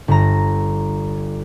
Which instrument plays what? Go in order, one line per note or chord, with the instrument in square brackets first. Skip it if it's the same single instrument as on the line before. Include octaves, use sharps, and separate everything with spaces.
[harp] G1 A#5